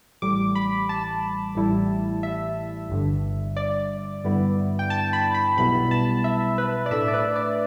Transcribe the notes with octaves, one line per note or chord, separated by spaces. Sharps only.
A1 A2 G3 D6
B5
A5
A1 A2 G3 E4
E5
G1 G2 D3
D5
G2 D3 G3 B3 E4
G5
A5
B5
B5
B1 B2 G3 B3 E4 B5
A5
E5
B4
D5
A2 A3 D4 E5
D5
B4
D5